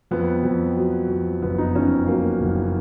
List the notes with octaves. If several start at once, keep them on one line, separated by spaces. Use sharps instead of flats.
F2 B3
F2
F#3
F2
F#1 B3
D#4
F2 C#4
F#3 A#3
F#1